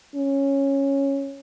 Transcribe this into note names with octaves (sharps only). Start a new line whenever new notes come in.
C#4